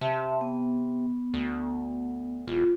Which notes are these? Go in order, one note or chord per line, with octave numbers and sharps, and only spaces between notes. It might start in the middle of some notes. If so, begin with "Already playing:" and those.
C3 E5 A5
B3
D2
E1 F4